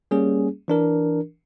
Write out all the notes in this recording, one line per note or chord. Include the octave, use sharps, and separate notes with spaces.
G3 A#3 C#4 G#4
E3 D4 A#4